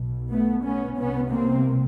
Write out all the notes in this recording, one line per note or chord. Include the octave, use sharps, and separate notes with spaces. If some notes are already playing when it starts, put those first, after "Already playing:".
Already playing: B1 B2
A3 B3
B3 C#4
C2 C3 B3 C#4
A#3 C4